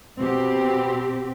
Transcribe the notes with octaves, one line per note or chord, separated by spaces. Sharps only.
B2 C4 G4